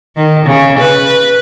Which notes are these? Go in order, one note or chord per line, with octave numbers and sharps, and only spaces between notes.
D#3
C#3
B4